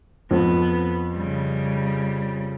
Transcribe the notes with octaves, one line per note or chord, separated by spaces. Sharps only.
F2 B3
C#3 G3